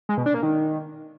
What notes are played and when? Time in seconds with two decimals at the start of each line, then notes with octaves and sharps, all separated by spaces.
0.09 G#3
0.17 B2
0.26 D4
0.34 A#3
0.43 D#3